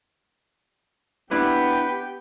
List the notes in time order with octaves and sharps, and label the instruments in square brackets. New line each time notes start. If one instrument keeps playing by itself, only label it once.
[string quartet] B3 [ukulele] D4 E4 [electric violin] G4 G5 [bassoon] B4